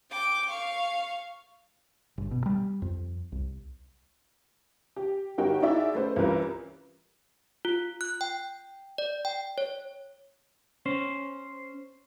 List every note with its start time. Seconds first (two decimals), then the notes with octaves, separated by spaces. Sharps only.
0.10 G5 D6
0.50 F5 C#6
2.18 G1
2.31 B2
2.46 G3
2.82 F2
3.32 C2
4.96 G4
5.38 G1 D#4 F#4 G4 A#4 G5
5.62 D#4 E4 F#4 G#4 D5 E5
5.94 A3 C#4 A4 B4 C5
6.16 C2 E3 C#4 F4 A#4 B4
7.65 F4
8.01 F#6
8.21 G5
8.98 D5
9.25 G5
9.58 C#5
10.86 C#4 C5